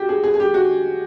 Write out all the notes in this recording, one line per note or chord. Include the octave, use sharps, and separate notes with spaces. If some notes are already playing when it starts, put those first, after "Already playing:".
Already playing: F#4 G4
G#4
G#4
G#4
G4
F#4